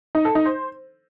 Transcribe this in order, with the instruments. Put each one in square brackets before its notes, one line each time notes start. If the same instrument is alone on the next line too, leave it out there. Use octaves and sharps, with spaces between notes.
[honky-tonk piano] D#4
A4
D#4
C5